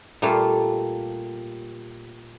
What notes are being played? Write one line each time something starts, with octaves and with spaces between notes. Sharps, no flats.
A#2 G3 A3 A#3 F4